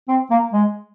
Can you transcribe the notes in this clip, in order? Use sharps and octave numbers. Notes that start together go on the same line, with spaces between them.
C4
A#3
G#3